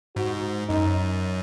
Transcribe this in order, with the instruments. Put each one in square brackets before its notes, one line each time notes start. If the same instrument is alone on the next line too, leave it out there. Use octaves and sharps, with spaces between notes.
[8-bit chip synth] G#2 [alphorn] F#4
[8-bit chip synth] F#2 [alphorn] D#4